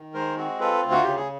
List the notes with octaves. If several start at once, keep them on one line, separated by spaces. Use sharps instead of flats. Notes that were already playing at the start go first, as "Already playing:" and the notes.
Already playing: D#3
G#3 A#4 C5
C4 F#4
F4 A4 B4
D2
F#4
C#3 G4
G#4